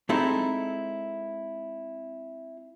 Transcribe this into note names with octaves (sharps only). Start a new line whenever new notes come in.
G#3 C4 D#4 E4 A4